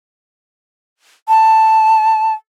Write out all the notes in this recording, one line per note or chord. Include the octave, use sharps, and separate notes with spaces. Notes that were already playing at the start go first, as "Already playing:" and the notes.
A5